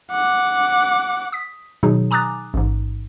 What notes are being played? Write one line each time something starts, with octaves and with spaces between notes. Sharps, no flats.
F#5 D6
D#6 B6
B2 D#3 F#3 D#4 G#4
G#5 A#5 D6 D#6 F#6 A6
A1 G#2